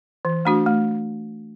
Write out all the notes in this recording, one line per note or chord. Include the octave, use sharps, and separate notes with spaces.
E3
A3 D4 F#4
A3